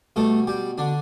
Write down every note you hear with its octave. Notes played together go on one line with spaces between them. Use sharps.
B2 G3 A3 A4
G3 G4
D3 D4